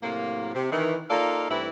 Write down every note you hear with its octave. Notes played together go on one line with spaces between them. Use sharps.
A2 C3 F#3 A#3
C3
D#3 E3
A#3 D#4 F4 A4 D5 F5
G2 E3 A3 C4 E4